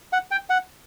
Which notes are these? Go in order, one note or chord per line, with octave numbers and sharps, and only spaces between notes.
F#5
G5
F#5